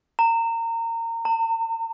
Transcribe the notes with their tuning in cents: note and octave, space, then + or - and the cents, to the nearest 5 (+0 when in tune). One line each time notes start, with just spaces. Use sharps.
A#5 -25
A#5 -45